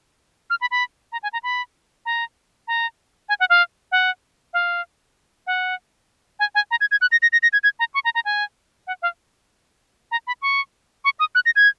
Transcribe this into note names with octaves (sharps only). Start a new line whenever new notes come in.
F6
B5
B5
A#5
G#5
A#5
B5
A#5
A#5
G#5
F#5
F5
F#5
F5
F#5
G#5
G#5
A#5
G#6
G#6
F#6
A#6
A#6
A#6
A#6
G#6
G#6
A#5
C#6
A#5
A#5
G#5
F#5
F5
A#5
B5
C#6
C#6
D#6
F#6
A#6
G#6